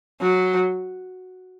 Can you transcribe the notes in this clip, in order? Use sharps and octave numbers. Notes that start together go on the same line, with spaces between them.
F#3